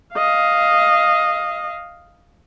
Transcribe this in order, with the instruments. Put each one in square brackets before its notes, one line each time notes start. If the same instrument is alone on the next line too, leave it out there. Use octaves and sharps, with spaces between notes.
[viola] D#5 F5